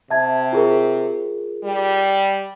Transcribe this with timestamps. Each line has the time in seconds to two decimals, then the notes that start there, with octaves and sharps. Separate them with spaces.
0.10 C3 E5 A5 G#6
0.53 F4 G#4 A#4
1.64 G3